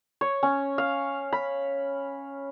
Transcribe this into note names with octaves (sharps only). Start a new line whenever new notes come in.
C#5
C#4
F5
B5